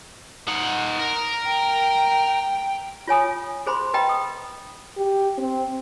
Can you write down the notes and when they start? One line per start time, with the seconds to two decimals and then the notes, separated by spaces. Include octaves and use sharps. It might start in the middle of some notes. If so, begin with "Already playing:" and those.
0.48 D#4 F#5
0.99 A#4
1.47 G5
3.07 F4 C#5 G#5 D#6
3.66 G#4 C5 B5 C6
3.94 B4 D#5 G5 A#5 B5
4.09 D#6
4.97 G4
5.38 C4